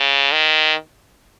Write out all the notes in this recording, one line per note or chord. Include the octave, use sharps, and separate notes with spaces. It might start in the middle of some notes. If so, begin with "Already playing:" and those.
Already playing: C#3
D#3